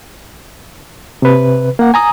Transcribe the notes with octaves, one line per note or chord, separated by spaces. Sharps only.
C3 B4
A#3 F#5
G#5 A#5 D#6